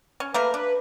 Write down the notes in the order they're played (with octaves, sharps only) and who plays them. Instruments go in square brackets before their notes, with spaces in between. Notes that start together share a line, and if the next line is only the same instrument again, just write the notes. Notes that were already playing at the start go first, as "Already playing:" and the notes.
[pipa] C#4
[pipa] A3 A#3 A#4 [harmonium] B4
[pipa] D4 [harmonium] B4